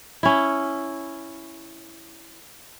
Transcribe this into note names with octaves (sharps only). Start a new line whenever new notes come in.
C#4 E4